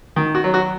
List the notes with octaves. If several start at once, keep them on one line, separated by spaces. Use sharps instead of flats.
D#3
F#4
F#3
F#4